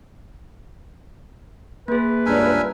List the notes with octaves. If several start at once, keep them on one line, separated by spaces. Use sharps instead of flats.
A#3 G#4 B4
C#2 G2 D4 A#4 E5 G#5